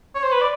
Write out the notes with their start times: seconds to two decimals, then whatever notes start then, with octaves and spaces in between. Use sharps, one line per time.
0.15 C#5
0.24 C5
0.32 B4
0.41 D5